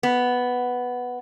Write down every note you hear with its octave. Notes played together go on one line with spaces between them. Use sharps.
B3